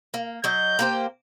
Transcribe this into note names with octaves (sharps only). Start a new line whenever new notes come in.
A#3
F#3 D#5 G6
A#3 G4 C5